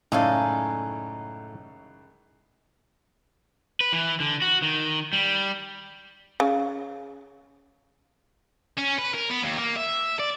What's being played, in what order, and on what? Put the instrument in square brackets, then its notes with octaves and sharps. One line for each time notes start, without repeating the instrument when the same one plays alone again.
[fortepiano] C#2 F#2 D5 [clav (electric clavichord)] A2 [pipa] D#4 [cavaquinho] A4 F5 G#5
[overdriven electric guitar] B4
E3
D3
F#4
D#3
G3
[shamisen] C#3
[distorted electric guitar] C#4
B4
A#4
B3
D#2
A#3
E5
D5